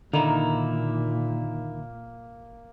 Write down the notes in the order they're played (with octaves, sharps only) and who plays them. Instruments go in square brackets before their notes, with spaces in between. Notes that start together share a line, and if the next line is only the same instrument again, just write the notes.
[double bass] A#2 [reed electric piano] D3 [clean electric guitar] D#3 D#4 E4 [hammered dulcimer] A#3